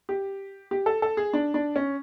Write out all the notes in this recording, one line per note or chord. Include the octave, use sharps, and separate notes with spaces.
G4
G4
A4
A4
G#4
D4
D4
C#4